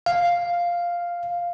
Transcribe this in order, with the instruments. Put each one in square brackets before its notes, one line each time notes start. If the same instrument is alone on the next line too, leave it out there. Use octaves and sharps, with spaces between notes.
[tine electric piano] F5